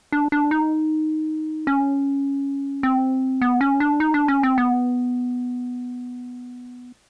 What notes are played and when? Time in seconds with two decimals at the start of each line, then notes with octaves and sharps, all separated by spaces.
0.12 D4
0.32 D4
0.51 D#4
1.67 C#4
2.83 C4
3.42 B3
3.61 C#4
3.80 D4
4.00 D#4
4.14 D4
4.28 C#4
4.43 C4
4.58 B3